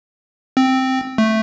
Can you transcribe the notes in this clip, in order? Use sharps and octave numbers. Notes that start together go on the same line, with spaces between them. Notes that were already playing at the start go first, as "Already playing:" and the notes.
C4
A3